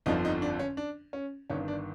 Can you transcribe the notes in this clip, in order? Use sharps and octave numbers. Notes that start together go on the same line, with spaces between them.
G1 F2 D3 F3 D#4
D#4
D4
C#4
D4
C#4
G1 G2 D#3 C#4
D4